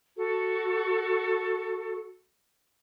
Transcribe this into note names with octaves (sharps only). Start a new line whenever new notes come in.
F#4 A4